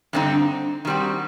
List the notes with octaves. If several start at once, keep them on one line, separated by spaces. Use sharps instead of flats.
G2 D3 A3 C4 D#4
D#3 G3 C4 F#4